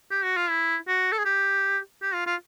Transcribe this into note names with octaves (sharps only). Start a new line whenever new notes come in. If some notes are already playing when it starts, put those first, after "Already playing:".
G4
F#4
F4
E4
F#4
A4
G#4
G4
G4
F4
F4